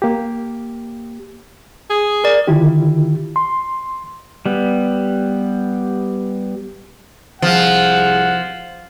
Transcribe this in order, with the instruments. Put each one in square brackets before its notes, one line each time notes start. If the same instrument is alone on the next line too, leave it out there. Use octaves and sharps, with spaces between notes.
[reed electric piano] A#3 G4
[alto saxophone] G#4
[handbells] A#4 D5
[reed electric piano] D3 D#3 E4 F4 G4
C6
[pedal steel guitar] G3 B3
[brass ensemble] C2 G#4 F#5 [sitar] F3